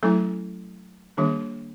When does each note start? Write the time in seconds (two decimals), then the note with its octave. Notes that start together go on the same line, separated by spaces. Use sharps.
0.03 F#3 A3 C#4 E4 A4
1.17 D#3 G3 A#3 D4 G#4